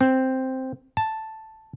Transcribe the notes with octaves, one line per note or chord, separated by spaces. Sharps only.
C4
A5